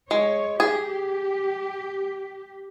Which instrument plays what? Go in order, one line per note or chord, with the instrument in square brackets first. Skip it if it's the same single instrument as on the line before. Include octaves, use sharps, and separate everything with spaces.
[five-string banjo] G#3 [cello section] C#5
[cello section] G4 [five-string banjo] G#4